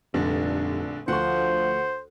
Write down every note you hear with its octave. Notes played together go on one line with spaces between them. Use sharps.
F1 A#1 G2 D3 D4
D2 F3 C5 F#5 C6 C#6